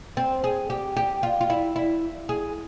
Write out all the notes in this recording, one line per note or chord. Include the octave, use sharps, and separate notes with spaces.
C4
G#4
G4
G4
F4
F4
E4
E4
G#4